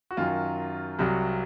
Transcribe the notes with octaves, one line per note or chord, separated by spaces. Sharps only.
F#4
F#2 D#3 F#3 F4
C2 C3 F#3